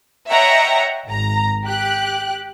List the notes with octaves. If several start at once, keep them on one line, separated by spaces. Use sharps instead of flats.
C#5 D#5 E5 F#5 G5 A#5
G#1 A#5
G4 F#6